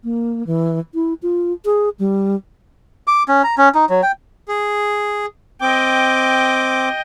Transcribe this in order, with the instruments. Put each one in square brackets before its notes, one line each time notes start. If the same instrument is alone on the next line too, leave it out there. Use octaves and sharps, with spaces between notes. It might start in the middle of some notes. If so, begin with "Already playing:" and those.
[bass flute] A#3
E3
E4
F4
G#4
G3
[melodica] D6
C#4
A#5
C#4
D#4
F#3
G5
[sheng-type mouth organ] G#4
[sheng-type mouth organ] C4 D6 [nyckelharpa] D#5 G5